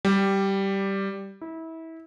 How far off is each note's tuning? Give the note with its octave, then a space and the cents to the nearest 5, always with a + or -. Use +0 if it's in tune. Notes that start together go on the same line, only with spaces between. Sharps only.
G3 -5
E4 -25